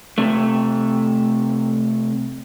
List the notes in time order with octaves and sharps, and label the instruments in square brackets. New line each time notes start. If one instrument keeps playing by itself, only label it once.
[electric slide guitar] C3 A3